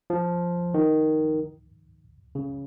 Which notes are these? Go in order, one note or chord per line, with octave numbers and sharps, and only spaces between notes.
F3
D#3
C#3